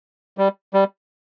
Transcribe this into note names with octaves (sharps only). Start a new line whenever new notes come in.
G3
G3